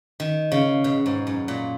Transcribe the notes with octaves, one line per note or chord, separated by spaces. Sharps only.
D#3
C#3
B2
G#2
F#2
A#2